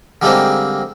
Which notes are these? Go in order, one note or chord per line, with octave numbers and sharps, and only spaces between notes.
D3 G3 G#3 A#3 C4 D#4